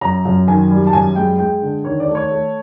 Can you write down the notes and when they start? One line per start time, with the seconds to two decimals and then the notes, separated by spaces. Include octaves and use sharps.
0.01 F#2 A#5
0.25 F#2
0.47 D#3 G#5
0.70 G3
0.87 A5
0.93 F#2 G#5
1.15 G#3 G5
1.38 G#3 G5
1.62 D3
1.84 D#3 C#5
2.00 D5
2.08 A3
2.15 C#5
2.30 A3